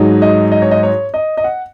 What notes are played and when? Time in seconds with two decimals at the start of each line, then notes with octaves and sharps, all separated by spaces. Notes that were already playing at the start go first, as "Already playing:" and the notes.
Already playing: G#2 F#3 D#4
0.22 D#5
0.52 D#5
0.62 C#5
0.71 D#5
0.83 C#5
1.14 D#5
1.37 D#5
1.44 F#5